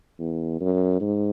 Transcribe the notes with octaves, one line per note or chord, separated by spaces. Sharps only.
E2
F#2
G#2